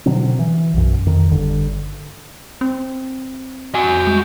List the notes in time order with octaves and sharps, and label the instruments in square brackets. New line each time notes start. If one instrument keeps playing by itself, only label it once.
[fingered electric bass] B2 D3 F#3 C4
E3
B1 F#2
F2 D#3
G1 D3
[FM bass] C4
[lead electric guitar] F#4 G#5
[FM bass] G#3